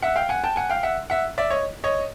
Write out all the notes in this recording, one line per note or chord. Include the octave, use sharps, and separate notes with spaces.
E5 F#5
F5 G5
F#5 G#5
G5 A5
F#5 G#5
F5 G5
E5 F#5
E5 F#5
D5 E5
C#5 D#5
C#5 D#5